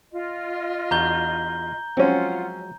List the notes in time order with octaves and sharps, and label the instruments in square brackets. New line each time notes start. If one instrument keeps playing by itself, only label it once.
[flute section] F4 D#5
[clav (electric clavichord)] E2 D4 F#4 [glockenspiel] A#5 G6 G7
[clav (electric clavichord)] F3 F#3 G#3 [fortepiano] C4 C#4 [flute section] F4 F#5